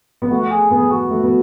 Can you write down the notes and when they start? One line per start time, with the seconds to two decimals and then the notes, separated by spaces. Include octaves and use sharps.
0.22 B3
0.30 A3 F#4
0.51 G#4
0.71 B3 G#4
0.91 F#4
1.11 A3
1.23 B3